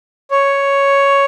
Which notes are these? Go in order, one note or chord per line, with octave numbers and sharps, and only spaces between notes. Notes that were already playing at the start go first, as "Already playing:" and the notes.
C#5